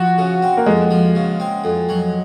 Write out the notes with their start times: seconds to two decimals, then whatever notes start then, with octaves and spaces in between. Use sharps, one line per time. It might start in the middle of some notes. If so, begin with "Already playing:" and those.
Already playing: F3 F#4
0.18 C#3
0.42 C4
0.57 A#3
0.66 F2 G#3
0.91 F3
1.15 C#3
1.40 C4
1.64 F2
1.89 F#3